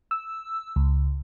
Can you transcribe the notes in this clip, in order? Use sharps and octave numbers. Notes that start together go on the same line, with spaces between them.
E6
C#2